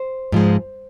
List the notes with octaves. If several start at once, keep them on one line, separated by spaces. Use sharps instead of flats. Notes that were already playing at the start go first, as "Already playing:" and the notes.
Already playing: C5
G#2 F3 G#3